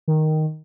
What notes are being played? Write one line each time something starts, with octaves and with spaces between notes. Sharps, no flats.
D#3